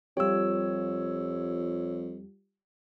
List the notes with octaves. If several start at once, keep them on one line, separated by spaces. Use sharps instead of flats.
F2 G3 F4 G4 C#5 E6